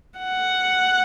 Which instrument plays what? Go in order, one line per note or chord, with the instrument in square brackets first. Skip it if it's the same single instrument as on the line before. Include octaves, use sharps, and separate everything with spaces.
[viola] F#5